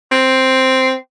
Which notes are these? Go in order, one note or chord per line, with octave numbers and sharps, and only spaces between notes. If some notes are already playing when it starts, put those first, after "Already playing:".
C4